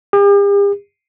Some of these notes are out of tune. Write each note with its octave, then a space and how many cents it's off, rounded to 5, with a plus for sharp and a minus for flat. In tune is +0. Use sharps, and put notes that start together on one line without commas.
G4 +45